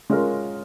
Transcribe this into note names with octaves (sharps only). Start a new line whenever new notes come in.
G#3 C#4 F4 A#4